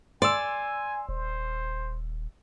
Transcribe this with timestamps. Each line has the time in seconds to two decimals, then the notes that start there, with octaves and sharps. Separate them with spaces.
0.22 D5 G#5 C6 E6
1.09 D#1 C5